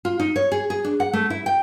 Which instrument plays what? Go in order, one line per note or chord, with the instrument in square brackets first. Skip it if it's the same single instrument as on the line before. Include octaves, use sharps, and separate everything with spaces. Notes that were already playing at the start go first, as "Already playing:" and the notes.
[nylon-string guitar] F4
D#4
C#5
G#4
G#4
D4
F#5
A3
E4
G5